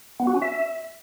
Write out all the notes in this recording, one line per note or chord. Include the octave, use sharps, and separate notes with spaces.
B3
F#4
C#4
E5